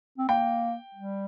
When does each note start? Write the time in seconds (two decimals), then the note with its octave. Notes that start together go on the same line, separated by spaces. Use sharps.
0.18 C4
0.29 A#3 G5
0.95 G3